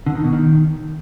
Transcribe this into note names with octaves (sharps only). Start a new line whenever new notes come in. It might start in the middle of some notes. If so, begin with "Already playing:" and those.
D3
D#3
B2
D#3